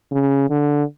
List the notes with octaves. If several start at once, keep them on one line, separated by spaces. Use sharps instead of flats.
C#3
D3